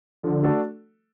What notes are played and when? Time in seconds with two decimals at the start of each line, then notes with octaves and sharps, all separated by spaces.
0.23 D3 F3
0.43 A3 D4 F#4 A4